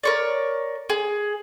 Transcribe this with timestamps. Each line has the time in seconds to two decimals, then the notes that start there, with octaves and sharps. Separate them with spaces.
0.03 A#4 C#5 D5
0.90 G#4